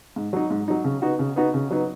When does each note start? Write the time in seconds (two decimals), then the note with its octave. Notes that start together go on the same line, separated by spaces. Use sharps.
0.16 G#2
0.33 F#3 D#4
0.51 G#2
0.68 F#3 D#4
0.84 C#3
1.02 B3 D#4 F#4
1.19 C#3
1.36 B3 D#4 F#4
1.54 C#3
1.71 F#3 B3 D#4